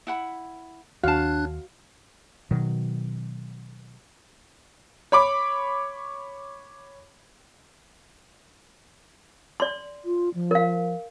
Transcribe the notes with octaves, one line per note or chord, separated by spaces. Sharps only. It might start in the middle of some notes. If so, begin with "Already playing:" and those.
E4 F#5 B5
D#2 D4 F#4 C#5 F5 A5 F#6
B2 D#3 F#3
C#5 B5 D6
D5 C6
F4
F3
A#4 F5